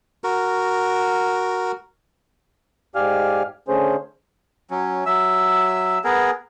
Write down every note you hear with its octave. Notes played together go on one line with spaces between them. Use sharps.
F#4 A#4
G#2 G4 D5 F5 G#5 F6
D3 A3 C#4 G#4 C5
F#3 C#4
F#3 E5 E6
B3 G#4 A#4